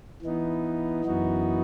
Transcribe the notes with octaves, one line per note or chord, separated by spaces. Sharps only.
E3 B3 D#4
F#2 E3 B3 D#4 F#4